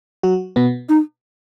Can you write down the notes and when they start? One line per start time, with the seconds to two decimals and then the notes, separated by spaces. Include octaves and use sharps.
0.23 F#3 F#4
0.56 B2 B3
0.89 D#4